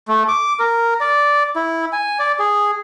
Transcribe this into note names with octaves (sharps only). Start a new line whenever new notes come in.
A3
D6
A#4
D5
E4
G#5
D5
G#4